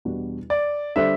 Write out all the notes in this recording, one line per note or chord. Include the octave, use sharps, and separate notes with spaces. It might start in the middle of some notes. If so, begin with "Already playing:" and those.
E2 B2 G3 D4 F#4
D5
D3 G3 D4 A4 C5 E5